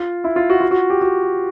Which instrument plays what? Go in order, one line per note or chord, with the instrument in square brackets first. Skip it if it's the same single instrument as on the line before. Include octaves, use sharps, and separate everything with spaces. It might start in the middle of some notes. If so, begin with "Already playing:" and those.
Already playing: [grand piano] F4
E4
F4
F#4
F4
F#4
G4
F#4